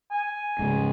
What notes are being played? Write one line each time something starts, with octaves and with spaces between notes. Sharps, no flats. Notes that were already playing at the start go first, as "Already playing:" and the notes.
G#5
G#2 C#3